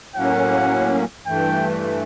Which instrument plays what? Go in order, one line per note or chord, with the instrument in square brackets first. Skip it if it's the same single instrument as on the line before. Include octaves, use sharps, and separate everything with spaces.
[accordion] A2 F#3 A#3 C#4 [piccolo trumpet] F#5
[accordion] G2 E3 A3 [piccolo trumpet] G5